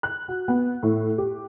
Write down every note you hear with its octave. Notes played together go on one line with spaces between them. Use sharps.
F#6
F#4
B3
A2
G4